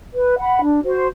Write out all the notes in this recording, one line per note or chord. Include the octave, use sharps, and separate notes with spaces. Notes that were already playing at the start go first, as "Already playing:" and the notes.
B4
F#5 B5
D4
F#4 C5